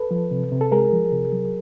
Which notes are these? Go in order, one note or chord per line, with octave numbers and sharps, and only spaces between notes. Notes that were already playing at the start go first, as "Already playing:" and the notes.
Already playing: A4 B4
F3
C3
C3
A4
G#3 G#4 A#4
F3
C3
F#3